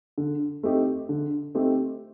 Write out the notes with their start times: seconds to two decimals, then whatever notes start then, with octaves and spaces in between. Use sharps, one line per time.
0.18 D3
0.63 A3 C4 D#4 G4
1.09 D3
1.55 A3 C4 D#4 G4